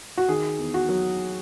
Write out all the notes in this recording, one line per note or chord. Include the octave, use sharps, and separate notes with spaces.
F#4
D#3 G#4
E2
F#4
F#3